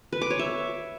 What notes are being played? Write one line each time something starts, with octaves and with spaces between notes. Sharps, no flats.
B4
D6
C#5
E5